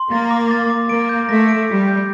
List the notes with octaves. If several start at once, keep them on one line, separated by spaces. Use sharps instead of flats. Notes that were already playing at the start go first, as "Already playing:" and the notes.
Already playing: C6
A#3 A6
D6
A6
D6
A#3 D7
G6
A3 A#6
D7
G3 D6
G6